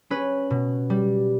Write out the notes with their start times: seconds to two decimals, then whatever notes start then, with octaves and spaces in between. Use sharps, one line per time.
0.10 C#4 B4
0.50 B2
0.90 G3